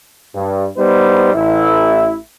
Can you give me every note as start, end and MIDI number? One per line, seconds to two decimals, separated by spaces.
0.35 0.68 43
0.78 1.31 55
0.78 1.31 59
0.78 1.31 63
0.78 1.31 72
1.34 2.17 33
1.34 2.17 64